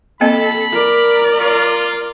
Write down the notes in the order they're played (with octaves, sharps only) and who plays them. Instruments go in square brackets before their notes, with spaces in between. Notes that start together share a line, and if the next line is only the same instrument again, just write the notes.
[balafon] A#3 C4 D#5 [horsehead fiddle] A4 [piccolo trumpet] B5
[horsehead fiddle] A#4 D5
[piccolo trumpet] F4